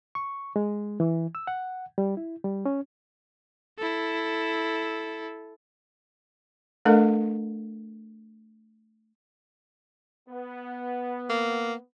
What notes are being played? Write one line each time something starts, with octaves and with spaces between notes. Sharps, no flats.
C#6
G#3
E3
E6
F#5
G3
E4
G3
C#4
E4 A4
A3 D4 A4 A#4 D#5 F5
B3
A#3